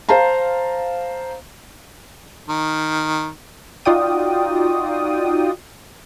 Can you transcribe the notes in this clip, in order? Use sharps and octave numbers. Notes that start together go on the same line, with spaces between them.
C5 F5 A5 A#5
D#3
D#4 F4 F#4 D5 G5 D#6